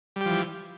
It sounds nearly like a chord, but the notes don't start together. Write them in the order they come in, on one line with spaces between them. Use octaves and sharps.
G3 G4 F3 E3